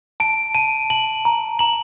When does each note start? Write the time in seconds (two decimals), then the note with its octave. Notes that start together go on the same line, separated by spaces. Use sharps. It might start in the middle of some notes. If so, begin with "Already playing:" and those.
0.20 A5 D7
0.55 A5 D#7
0.90 A5 F#7
1.25 A#5
1.59 A#5 F#7